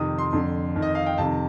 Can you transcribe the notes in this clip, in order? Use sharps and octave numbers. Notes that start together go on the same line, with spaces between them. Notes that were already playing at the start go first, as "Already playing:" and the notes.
Already playing: F2 C3 D#3 D#6
C6
F2 D3
F2 D#3
D#5
F5
G5
F2 C3 D#3 A5